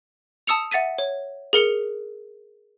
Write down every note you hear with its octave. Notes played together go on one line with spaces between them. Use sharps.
A5 D#6 E6 C#7 F7
E5 F#5 A6 B6 D#7
C#5
G#4 A#4 C#7 F7